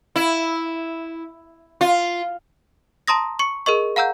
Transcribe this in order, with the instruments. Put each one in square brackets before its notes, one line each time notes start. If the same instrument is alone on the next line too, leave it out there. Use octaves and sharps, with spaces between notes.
[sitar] E4
F4
[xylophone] A5 A#5 C6 D#6 A#6
C#6 C#7
G#4 A#4 D#5 C#6
F5 F#5 A#5 E6 G6